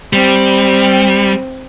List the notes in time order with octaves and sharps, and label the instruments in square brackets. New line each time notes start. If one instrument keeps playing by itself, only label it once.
[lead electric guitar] G3 [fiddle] C4